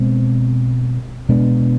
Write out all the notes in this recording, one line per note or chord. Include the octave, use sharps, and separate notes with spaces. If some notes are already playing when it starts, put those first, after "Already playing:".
Already playing: B2 G#3 C4
B2 G#3 B3 D4